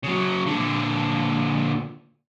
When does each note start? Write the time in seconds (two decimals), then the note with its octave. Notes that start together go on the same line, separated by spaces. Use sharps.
0.04 C#3 F#3
0.47 A#2 D3